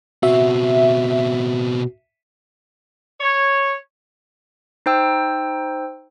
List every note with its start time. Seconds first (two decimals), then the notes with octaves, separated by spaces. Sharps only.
0.23 B2 C4 F#4 E5
3.21 C#5
4.86 D#4 C5 G5 E6